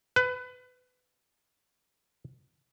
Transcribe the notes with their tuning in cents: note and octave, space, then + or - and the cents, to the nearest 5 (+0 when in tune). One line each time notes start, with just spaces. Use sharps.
B4 +25